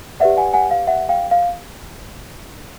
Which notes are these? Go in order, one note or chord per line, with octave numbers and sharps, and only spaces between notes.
G4 B4 D5 E5 F#5
F#5 G#5
F#5 G#5
F5
E5 F#5
F5 G5
F5